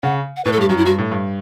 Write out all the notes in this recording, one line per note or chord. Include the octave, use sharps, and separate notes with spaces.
C#3 F#5
F#5
A2 B4
A4
G2 G4
F#2 F#4
E4
G2 F#4
A2
G2